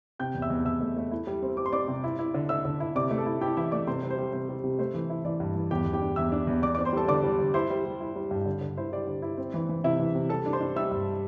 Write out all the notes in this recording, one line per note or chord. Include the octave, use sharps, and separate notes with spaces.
C3 G5 G6
E2
E5 E6
E2
E2 E5 E6
A3
A3
E4
G3
C4
G3 D6
C6
C4 D5 D6
C3
E4
E4
D3
D3 E5 E6
D3
E4
C3 D5 D6
A3
A4 A5
E4
E4 G4 G5
E3 E4 E5
A3 D5 D6
C3 C5 C6
G3
C5
G3
C3 C5
G3
C3
A3 C5
E3
E4
E3 D5
G2
E3
E2 G4 G5
E2
G4 G5
D4
E2 E5 E6
D4
E2
E2 D5 D6
C4 D5 D6
C5 C6
G3 A4 A5
D3 D5 D6
G3
D3
E4 C5 C6
G3
G3
E4
G3
G2
D3
D3
E4 C5
G3 D5
D3
E4
C4
E3
E3
C3 E4 E5
E3
C3
G3 A4 A5
D4
C5 C6
D4
G3 E5 E6
G2